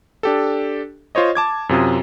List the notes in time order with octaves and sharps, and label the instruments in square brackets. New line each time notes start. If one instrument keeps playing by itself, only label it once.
[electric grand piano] D4 G4 A4
F4 C5 C#5 D#5
A5 D6 G#6
F#2 C3 F4 D#6